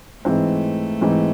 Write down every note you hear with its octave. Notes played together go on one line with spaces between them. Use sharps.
G#2 E3 A3 C4
G#2 E3 C4